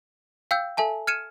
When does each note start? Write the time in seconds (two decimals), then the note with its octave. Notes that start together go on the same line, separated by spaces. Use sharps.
0.51 F5 G5 E6 G6
0.77 A4 E5 G#5 A5
1.07 F6 G#6 C#7 D#7 E7